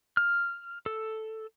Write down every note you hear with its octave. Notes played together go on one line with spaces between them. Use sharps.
F6
A4